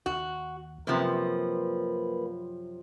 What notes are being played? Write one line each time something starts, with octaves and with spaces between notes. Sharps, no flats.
D#2 F#4
F#2 C3 F3 A#3 B4